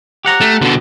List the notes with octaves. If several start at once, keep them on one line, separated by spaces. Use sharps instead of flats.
G4 F#5 A#5
A3
B2 D3